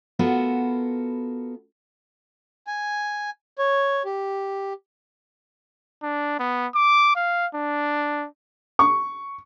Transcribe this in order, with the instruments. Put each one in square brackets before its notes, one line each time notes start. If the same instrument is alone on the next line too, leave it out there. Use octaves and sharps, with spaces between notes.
[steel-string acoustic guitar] B3 F4 F#4 A4 A#4
[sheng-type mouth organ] G#5
C#5
G4
[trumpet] D4
B3
D6
F5
D4
[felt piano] C#6